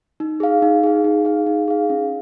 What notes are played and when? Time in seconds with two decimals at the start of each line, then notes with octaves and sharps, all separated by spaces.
0.20 D#4
0.40 G#4 F5
0.62 D#4
0.83 G#4 F5
1.04 D#4
1.25 G#4 F5
1.46 D#4
1.68 G#4 F5
1.90 C#4